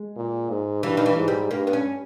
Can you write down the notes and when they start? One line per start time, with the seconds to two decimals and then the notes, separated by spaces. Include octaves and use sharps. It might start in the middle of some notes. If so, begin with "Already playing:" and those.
Already playing: G#3
0.16 A#2
0.50 G#2
0.83 G2 E3
0.97 D#3
1.06 E3
1.17 G#2
1.28 G3
1.51 G2 A#3
1.67 B3
1.73 C#4